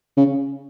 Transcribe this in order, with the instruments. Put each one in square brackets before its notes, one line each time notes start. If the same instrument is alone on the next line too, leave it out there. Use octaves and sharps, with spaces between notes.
[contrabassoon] C#3